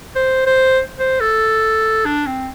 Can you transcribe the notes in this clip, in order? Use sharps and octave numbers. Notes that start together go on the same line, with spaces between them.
C5
C5
C5
A4
D4
C4